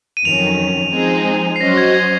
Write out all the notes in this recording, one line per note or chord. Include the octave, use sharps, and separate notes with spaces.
D#7
F2 D#3 F#3 C#4 F7
F3 G#3 C4 D#4 G#4
C7
F#3 C#4 F#4 C5 D#5 A#6
G#6
G#6